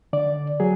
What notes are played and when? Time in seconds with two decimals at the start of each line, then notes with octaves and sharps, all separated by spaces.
0.13 D3 D5
0.60 F#3 G#4